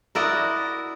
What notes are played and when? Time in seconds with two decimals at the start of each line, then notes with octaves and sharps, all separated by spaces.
0.15 E4 F#4 A#4 D5 D#5